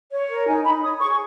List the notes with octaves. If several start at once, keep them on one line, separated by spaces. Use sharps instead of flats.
C#5
A#4
D#4 G#5
D#4 B5
C#5 D#6
G#4 C#6